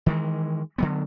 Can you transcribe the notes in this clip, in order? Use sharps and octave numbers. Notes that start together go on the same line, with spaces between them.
D#3 E3 G#3
D3 F#3 B3